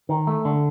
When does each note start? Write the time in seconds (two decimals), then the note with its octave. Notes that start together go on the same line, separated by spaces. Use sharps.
0.09 D#3
0.27 A3
0.45 D3